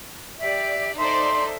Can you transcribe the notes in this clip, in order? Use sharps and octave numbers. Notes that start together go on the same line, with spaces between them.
G4 D5 E5 G5
D#4 A4 C5 D5 E5 A5 C6